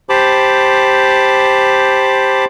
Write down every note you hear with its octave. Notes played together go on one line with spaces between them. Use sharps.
G4 C5 A5 B5 D6